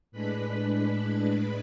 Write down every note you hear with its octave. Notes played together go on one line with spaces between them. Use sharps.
A2 G#3 D4 B4 B5